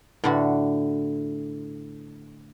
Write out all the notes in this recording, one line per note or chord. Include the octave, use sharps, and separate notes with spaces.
A2 D3 F#4